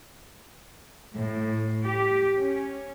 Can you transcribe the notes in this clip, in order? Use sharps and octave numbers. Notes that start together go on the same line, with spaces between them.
A2
G4
C#4